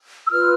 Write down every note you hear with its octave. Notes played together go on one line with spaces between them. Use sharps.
E6
F4 B4 F6